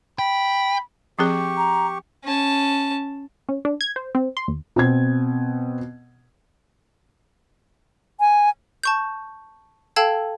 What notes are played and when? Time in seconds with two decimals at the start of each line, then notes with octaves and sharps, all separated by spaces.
0.19 G5 B5
1.19 F3 C4 G4 G#4 C#6
1.57 A#5
2.24 C#4 A5
3.49 C#4
3.65 D4
3.81 G#6
3.96 C5
4.15 C4
4.37 C6
4.48 D#2
4.76 B2 C4 G#6
8.20 G#5
8.84 A5 C#6 G6
9.96 A4 F5 G5 A5 E6 G#6